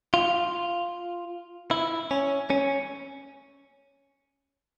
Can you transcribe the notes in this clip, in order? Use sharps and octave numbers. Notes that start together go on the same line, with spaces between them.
F4
E4
C#4
C#4